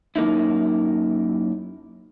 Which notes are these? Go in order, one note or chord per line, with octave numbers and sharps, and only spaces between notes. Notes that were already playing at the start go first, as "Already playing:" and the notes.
F#2 A#3 D#4 E4